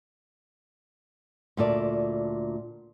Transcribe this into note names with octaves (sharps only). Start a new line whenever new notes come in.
D2 A#2 A4 D5